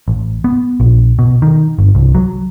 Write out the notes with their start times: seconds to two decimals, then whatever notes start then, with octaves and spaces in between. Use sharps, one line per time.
0.08 A1
0.44 B3
0.80 A#1
1.19 B2
1.42 D#3
1.78 G1
1.95 C2
2.15 F#3